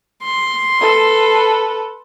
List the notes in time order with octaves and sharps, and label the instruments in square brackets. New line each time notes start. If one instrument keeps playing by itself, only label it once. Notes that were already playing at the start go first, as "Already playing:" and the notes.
[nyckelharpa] C6
[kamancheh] A4 B4